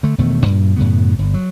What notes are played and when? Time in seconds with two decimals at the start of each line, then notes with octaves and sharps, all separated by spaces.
0.03 D3 A3
0.18 E1 B2 D#3 A3
0.46 F#2 A#2
0.76 F#2 A2 C#3 B3
1.19 G1
1.34 F#3